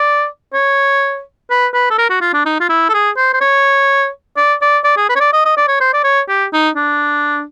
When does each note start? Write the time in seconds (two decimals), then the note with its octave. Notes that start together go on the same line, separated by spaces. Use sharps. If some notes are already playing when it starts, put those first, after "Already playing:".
Already playing: D5
0.54 C#5
1.50 B4
1.74 B4
1.90 A4
1.98 A#4
2.10 F#4
2.21 F4
2.33 D4
2.46 D#4
2.60 F4
2.69 E4
2.89 A4
2.94 G#4
3.17 C5
3.34 C5
3.41 C#5
4.37 D5
4.61 D5
4.84 D5
4.97 G#4
5.09 B4
5.16 C#5
5.20 D5
5.33 D#5
5.45 D#5
5.57 D5
5.68 C#5
5.80 C5
5.93 D5
6.04 C#5
6.28 G4
6.53 D#4
6.75 D4